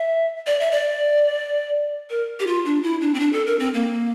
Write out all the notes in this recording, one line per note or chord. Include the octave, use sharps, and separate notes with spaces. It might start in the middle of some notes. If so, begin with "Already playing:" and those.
Already playing: E5
D5
E5
D5
A#4
G4
F4
D4
E4
D4
C4
D4
A4
A#4
C4
A#3